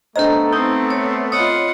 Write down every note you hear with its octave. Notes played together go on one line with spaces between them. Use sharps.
A3 B3 D4 A4 C5 D#5 A#5
C4 D#4 A#5 D#6 G6
C#5
F4 C#5 D#5 F#5 B5 D#6